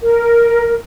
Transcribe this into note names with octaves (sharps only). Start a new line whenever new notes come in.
A#4